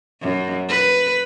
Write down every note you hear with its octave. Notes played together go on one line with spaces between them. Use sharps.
F#2
B4